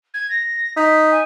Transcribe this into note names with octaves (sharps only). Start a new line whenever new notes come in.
G#6
A#6
D#4 B6
G#5